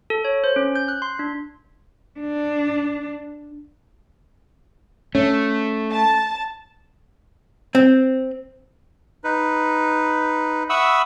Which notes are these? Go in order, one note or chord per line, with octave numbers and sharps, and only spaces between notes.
A4
C#5
C5
C#4
G6
F#6
C6
D4
D4
A3 C#4
A5
C4
D#4 B4
E5 F#5 B5 C#6 D#6 E6